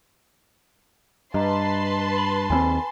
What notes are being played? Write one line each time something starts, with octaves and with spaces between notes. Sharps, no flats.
G2 B4 D#5 A5 A#5 C6
B5 F#7
D#2 A#3 C4 G#5 B5